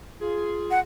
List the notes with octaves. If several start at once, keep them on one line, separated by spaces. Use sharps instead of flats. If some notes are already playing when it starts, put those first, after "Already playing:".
F4 G#4
F#5